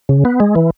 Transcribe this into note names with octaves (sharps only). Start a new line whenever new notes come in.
C#3
B3
G#3
E3